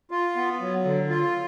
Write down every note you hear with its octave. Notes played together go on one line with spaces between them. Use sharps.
F4
B3
F#3
D3
F4